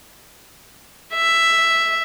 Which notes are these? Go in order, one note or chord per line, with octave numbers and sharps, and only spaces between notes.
E5